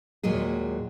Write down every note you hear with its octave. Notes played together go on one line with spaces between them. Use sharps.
D#2 A#2 F#3 G#3 G#4